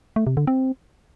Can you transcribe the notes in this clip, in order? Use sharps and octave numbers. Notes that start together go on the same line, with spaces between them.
A3
C3
D3
C4